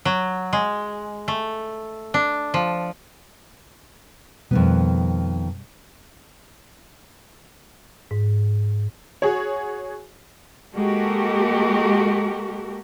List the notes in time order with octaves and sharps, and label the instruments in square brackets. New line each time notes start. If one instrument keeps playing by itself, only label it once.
[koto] F#3
G#3
A3
D4
F3
[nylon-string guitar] F2 D#3 B3 [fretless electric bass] B2 G3
[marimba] G#2
[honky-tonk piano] F#4 G#4 C#5
[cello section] G#3 A#3 F#4 G4 A4 A#4